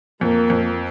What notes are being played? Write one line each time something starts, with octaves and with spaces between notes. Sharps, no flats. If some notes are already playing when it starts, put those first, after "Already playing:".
F2 A#3
F2